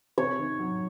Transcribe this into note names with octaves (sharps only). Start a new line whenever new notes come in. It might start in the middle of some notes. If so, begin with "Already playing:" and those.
C3 C#5
D#3
F#3